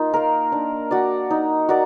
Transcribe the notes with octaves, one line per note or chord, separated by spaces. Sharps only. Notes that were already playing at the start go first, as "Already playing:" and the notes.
Already playing: A#3 D#4 F4
A#4 F5
D4
F#4 D5
D#4
F#4 A#4 D5